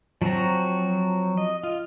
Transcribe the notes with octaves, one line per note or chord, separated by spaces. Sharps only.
F3 F#3 C4 F#4 A#5
D#5
F4